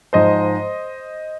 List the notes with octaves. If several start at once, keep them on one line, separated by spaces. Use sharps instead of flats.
G#2 F3 G#3 C5 D#5